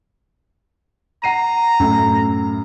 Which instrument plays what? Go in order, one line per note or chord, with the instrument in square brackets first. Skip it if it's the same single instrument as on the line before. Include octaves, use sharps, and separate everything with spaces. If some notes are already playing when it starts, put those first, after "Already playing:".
[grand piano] F#5 C7 D#7 [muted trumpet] A#5
[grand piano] F#2 A2